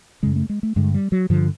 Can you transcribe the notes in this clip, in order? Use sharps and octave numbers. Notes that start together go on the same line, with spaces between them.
F#2 C#3 G#3
A3
G#3
A3
G2 D3 G#3
G3
F#3
G2 D3 F3